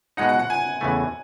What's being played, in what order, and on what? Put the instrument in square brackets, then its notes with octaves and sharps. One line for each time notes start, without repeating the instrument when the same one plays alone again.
[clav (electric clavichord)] B2 G#3 D#4 [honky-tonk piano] F#5
[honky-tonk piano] F#5
F#5
G#5
[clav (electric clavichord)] E2 C#3 E3 A3